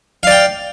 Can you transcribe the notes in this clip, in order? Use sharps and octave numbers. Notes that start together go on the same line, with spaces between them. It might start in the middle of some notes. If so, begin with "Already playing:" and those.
D5 F5 G5